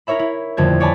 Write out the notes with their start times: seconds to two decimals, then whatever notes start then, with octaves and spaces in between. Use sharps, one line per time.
0.07 D#4 E4 A#4 C#5 E5 B5
0.19 E4
0.57 D#1 F2 D3 A3 G#6
0.80 C#5 D5 G#5 A5 B5